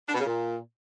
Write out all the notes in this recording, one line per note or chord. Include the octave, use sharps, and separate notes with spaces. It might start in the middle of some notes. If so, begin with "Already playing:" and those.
D4
B2
C#3
A#2